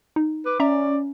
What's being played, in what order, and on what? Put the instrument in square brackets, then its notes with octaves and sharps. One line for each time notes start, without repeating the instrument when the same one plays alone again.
[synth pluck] D#4
[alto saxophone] B4 [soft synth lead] D6
[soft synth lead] C#4 [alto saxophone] D5 [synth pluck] E5 A#5